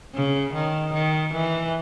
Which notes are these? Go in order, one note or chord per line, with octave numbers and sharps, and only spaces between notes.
C#3
D#3
D#3
E3